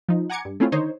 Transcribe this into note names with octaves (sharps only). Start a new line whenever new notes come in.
F3 D#4
F#5 G#5 A#5 D6 G#6 C#7
G2
A3 C4 C#4 E4 F4
D3 D#3 D#4 C5 C#5